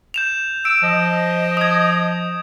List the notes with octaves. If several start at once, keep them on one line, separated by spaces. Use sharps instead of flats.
G6 E7 F7
E6 D7
F3 D#5
D#6 G#6